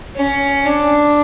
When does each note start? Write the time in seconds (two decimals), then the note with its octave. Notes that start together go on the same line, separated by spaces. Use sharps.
0.16 C#4
0.64 D4